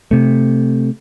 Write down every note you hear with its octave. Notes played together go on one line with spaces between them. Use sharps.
C3 A3